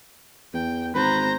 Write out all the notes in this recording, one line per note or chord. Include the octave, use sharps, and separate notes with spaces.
E2 G5
G#1 B4 C5 A#5